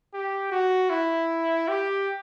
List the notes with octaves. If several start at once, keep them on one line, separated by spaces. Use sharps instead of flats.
G4
F#4
E4
G4